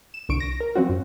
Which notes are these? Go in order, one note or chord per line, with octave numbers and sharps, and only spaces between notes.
E7
C2 D3 C#6 D7
A#6
A#4
E3 F#3 C4 C#4 F4 F#4
F#2